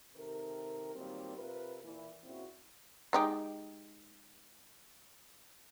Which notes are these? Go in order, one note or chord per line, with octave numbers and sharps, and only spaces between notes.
C3 D#3 A4 A#4
A#2 D#3 F#3 G3 A#3 C4
C3 F4 A#4 B4
A#2 E3
A#2 C#3 C4 E4 F#4
G#3 D#4 G4